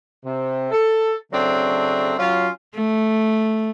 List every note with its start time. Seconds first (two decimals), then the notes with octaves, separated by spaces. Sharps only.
0.25 C3
0.71 A4
1.32 C#3 F#3 A3 C4 D4
2.19 F#3 C#4 F4
2.75 A3